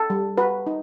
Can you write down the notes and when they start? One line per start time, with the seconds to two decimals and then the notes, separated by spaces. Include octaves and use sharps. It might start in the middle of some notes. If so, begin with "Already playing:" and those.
Already playing: A4
0.10 G3
0.37 F#4 B4
0.67 D#4